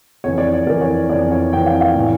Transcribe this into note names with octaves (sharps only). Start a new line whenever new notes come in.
F2 E3 C#5
D5
C#5
F2 E3 A#4
C#5
F2 E3 D5
C#5
F2 E3 G5
F5
F5
A2 E3